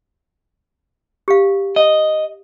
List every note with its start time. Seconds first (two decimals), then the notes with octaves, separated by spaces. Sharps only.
1.28 G4 F5
1.76 D#5